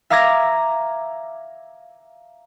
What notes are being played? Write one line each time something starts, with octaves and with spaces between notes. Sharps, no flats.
E5 F5 A#5 D6 G#6 A#6